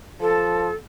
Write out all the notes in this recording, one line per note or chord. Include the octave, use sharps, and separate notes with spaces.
F3 A4